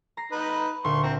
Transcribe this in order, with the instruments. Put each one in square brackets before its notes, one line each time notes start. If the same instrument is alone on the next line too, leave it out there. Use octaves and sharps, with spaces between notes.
[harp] A#5 A#6 C7
[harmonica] D#4 B4
[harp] D2 A#2 [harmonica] C6 C#6
[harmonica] C4 [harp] A#5